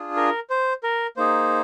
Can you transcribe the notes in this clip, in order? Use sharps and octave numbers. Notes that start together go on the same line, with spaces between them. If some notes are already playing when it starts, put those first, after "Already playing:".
Already playing: D4 F4 G#4
A#4
C5
A#4
A#3 D#4 G#4 C5